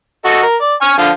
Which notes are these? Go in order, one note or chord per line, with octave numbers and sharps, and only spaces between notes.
F#4 A4 D#5
A#4
D5
G#5 C#6 F6
D3 F3 F4